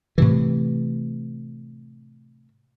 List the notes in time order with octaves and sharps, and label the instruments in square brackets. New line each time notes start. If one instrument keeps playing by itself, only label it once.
[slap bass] A2 C3 E3